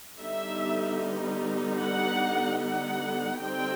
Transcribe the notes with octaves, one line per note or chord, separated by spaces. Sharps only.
D3 G3 B3 D#4 E5
F#5
F#5
D3 G3 C4 D#4 G5